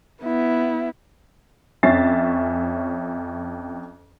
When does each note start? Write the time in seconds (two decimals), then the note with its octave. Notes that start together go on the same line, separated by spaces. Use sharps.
0.22 B3 E4
1.83 F2 C#4 E5 A6 C7